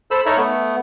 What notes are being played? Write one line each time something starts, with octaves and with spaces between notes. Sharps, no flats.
A4 C5 B5 E6
D#4 A4 A#4 C#5 E5 B5
A3 B3